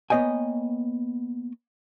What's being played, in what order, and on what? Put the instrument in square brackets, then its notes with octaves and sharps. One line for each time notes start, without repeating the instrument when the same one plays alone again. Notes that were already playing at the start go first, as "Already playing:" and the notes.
[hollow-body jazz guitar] A#3 B3 C#5 D#5 G5 G#5